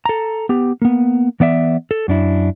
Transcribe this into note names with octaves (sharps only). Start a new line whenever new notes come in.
A4 A#5
B3 G4
A#3 B3
E3 B3 D5 E5
A4
F#2 D4 E4